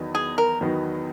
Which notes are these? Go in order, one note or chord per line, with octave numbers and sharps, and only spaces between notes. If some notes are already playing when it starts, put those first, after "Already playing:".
Already playing: E2 D#3 F#3 B3 D#4
G#4
A#4
E2 D#3 F#3 B3 D#4